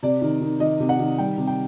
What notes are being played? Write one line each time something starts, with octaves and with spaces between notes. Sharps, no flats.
C3 D5
D#3
D#3
D#3 D#5
C3
F#5
D#3
G3 G5
C3
G5